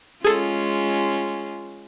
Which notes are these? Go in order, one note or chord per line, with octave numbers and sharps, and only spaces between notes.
G#3 C#4 F4 G#4 A4